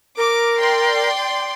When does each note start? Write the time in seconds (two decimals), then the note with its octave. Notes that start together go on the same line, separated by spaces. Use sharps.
0.17 A#4 D6
0.59 D5 G5 C6